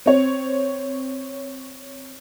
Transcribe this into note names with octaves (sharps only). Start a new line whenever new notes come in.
C4 C#5